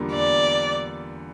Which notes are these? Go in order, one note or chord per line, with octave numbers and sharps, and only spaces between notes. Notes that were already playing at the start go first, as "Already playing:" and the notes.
Already playing: E2 D3 G3 A#3 F4
E2 D5